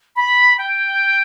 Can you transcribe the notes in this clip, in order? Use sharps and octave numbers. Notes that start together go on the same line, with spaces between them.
B5
G5